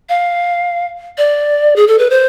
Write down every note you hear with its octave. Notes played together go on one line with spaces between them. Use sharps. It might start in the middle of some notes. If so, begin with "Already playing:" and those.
F5
D5
G#4
A4
B4
C5